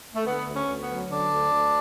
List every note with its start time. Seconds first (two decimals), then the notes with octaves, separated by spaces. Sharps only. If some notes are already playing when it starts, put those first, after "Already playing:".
0.16 A3
0.26 D3 B3
0.47 D2
0.54 C#4
0.68 D2
0.82 B3
0.89 F#3
1.10 D3 D4
1.31 D2
1.53 D2